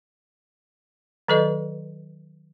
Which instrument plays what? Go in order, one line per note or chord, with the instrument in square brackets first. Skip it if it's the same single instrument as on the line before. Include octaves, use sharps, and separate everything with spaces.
[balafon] D#3 F#3 A4 B4 D#5